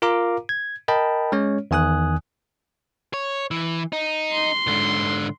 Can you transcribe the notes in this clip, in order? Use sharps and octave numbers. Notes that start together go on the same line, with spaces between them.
F4 A#4 F5 A#5 D6
G#6
A#4 D#5 G5 A5 B5
G#3 C#4 C#5
E2 D#3 G#5 D#6 F#6
C#5
E3
D#4
C6
G#2 D3